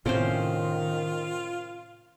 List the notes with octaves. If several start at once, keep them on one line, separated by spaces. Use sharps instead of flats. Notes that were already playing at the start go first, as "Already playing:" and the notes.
A2 C3 D#3 C4 C#4 F4 C5